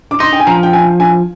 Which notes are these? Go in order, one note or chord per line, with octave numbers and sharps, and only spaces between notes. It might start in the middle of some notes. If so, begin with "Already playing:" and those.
D6
D#4 C6
G5
G#5
F3 A#5
G5
G#5
G#5